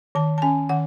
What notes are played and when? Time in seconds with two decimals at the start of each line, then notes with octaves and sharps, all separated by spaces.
0.15 D#3 A5
0.38 A5
0.42 C#4 G#5
0.69 D#3 F#5